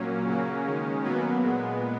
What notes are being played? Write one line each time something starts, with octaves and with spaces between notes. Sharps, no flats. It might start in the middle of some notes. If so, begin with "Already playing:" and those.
Already playing: A#2 F#3 A#3 C#4
C#3 F#3 A#3
D#3 G#3
B2 F#3 A#3 B3
A#2 G#3